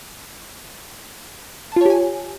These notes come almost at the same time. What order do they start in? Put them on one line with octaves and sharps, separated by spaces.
A5 F4 C#5 G4 G#5